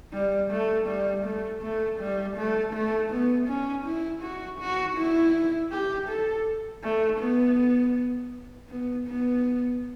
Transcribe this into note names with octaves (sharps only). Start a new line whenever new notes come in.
G3
A3
G3
A3
A3
G3
A3
A3
B3
C#4
E4
F#4
F#4
E4
G4
A4
A3
B3
B3
B3